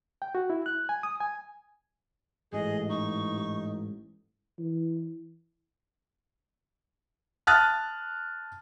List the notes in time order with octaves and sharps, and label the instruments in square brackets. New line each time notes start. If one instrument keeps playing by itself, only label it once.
[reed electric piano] G5
F#4
E4
F#6
G#5
D#6
G#5
[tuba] A1 [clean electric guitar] G#2 [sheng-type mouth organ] G#4 [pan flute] D#5
[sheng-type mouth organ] D#4 [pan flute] C#6
[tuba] E3
[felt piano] A5 D#6 F6 F#6 A6